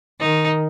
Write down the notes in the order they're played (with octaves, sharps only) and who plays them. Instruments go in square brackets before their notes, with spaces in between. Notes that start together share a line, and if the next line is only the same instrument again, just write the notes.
[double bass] D#3 [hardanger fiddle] D#4